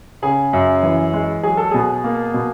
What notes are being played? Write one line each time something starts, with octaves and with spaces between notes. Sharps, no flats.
C#3 G#4
F#2
E3
G#3
F#3 G#4
A4
B2 G#4
A#3
B2